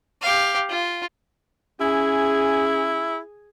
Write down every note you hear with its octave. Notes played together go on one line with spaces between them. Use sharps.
G4 F5
F4
C#4 E4 G#4